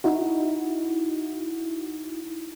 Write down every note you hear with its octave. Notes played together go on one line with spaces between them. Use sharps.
D#4 E4 F#4